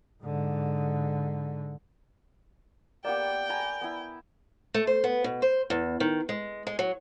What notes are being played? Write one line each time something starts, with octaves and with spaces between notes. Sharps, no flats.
G#2 D3
A#3 B3 G4 D5 F#5 G5
G#5 A#5 B5
B3 E4
A3
C5
B3
B2
C5
E2
D#3
G#3
G#3
F#3